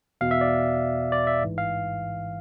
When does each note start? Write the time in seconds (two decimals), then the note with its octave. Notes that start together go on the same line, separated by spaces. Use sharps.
0.21 E2 B2 F5
0.31 E5
0.41 D5
1.12 D5
1.27 E5
1.42 A1 G#2 E3
1.58 F5